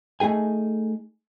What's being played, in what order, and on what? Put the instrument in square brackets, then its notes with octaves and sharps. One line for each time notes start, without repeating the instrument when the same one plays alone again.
[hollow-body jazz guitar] A3 D#4 G#4 G#5